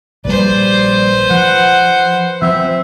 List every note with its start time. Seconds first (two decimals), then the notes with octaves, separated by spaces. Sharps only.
0.25 A#1 A#2 G3 B4 C5 D5
1.30 F3 F#5
2.42 F3 C4 E5